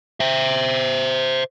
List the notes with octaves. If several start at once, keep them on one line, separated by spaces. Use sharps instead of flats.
C5 E5